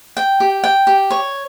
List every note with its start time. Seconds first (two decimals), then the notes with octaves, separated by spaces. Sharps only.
0.17 G5
0.40 G4
0.64 G5
0.87 G4
1.11 C#5